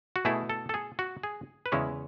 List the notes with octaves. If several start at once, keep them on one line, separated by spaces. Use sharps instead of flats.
F#4
B2 A3 E4 G#4
A4
A4
G#4
F#4
G#4
B4
E2 C#3 G#3 C#4 E4 C#5